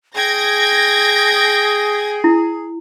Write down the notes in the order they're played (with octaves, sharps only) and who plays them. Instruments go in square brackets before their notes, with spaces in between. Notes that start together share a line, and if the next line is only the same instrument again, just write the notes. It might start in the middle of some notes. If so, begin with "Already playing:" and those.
[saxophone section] G#4 [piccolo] G5 [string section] G#6 A#6
[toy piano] E4